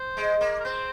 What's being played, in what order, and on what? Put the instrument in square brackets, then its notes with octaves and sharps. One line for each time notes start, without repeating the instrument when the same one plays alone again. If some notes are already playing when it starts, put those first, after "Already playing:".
Already playing: [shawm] C5
[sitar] G#3
A#3
[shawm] A#4
[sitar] C4 [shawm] C5